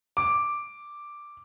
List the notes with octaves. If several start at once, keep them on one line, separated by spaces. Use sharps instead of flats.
D6